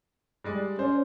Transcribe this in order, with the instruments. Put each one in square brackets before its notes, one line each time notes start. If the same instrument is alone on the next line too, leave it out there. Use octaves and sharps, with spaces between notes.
[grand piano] G3 G#3 D5
[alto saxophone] C#4 [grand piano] C5 D5